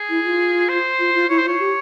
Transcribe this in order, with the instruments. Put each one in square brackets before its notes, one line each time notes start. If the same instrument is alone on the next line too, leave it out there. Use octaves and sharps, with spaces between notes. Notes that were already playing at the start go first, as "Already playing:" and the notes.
Already playing: [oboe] G#4
[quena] E4
F4
[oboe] C5
[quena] F4
F4
[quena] E4 [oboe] C#5
[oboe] C5
[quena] F4 [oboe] C#5
[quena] G4